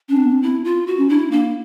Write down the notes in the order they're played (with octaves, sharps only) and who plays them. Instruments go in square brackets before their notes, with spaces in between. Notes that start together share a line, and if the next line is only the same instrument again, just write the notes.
[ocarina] C#4 [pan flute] D4
[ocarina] C4
B3
C4
[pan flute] E4
F4
F#4
[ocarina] C#4
[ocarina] D4 [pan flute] E4
[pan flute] A#3 [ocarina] D4